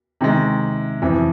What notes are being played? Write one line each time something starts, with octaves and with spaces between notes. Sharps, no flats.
C3 D#3 G#3
F2 C3 E3